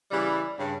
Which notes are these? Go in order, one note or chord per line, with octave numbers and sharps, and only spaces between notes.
C#3 E3 G3
G2 C#3